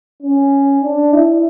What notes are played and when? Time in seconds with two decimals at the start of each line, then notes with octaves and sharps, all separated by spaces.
0.23 C#4
0.83 D4
1.13 E4